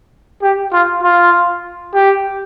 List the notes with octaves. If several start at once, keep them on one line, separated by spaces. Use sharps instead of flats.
G4
F4
F4
G4